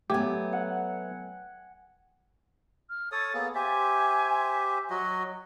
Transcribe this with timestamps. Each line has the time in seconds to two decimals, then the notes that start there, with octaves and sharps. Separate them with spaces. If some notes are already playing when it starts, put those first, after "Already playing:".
0.10 F#3 A3 B3 G4 G5 G#5
0.53 F#5
2.90 F6
3.12 A4 C#5 D#6 A6
3.34 A#3 B3 G#4
3.55 G4 C5 E5 G#5
4.90 F#3 F#4 D#5